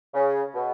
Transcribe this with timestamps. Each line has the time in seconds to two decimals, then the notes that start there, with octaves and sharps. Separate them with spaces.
0.14 C#3
0.55 B2